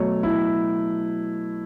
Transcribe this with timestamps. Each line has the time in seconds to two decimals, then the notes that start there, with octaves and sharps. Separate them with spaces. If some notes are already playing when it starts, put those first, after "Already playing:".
Already playing: B2 F#3 A3 C#5
0.23 E4